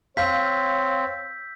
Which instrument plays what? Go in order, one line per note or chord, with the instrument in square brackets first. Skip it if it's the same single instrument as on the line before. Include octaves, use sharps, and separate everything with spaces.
[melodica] C4 [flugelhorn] C#5 [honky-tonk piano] F5 [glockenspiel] E6 G6 B6